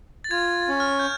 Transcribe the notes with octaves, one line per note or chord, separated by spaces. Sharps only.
A6
F4 G#6
C#4
F6
G6